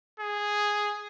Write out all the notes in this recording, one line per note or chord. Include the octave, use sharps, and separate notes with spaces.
G#4